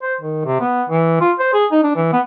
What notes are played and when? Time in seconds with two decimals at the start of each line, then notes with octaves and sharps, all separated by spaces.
0.02 C5
0.21 D#3
0.45 C3
0.61 B3
0.89 E3
1.20 F4
1.39 C5
1.53 G#4
1.72 D#4
1.83 D4
1.96 E3
2.13 B3